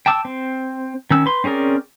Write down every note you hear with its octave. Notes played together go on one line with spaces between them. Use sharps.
G5 A5 D6 E6
C4
D#3 C#4 E6
B4 C6
C4 C#4 G#4 A#4 D5